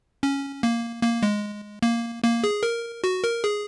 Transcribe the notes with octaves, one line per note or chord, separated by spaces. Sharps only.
C#4
A#3
A#3
G#3
A#3
A#3
G#4
A#4
F#4
A#4
G#4